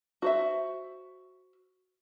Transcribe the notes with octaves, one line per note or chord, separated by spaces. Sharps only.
F#4 C5 E5